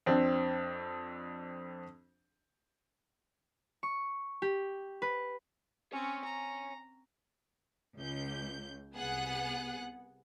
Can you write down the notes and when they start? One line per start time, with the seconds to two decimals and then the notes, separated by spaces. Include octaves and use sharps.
0.06 F2 C4 D4
3.83 C#6
4.42 G4
5.02 B4
5.93 C4 C#4 C#5 G#5
6.24 A#5
7.97 C#2 G6
8.96 C2 B3 G#4 F#5 F#6